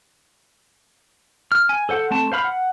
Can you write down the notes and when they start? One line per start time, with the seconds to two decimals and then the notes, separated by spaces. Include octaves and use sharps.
1.52 F6
1.69 G#5
1.89 A4 C5 F#5
2.11 A3 C4 A5
2.32 C5 F5 B5 F6
2.44 F#5